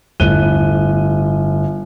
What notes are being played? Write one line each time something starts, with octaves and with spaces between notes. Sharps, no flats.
G1 A2 F#6 D#7 G7